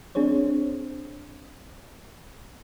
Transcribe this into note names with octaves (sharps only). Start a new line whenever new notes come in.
C4 D4 G#4 C5 C#5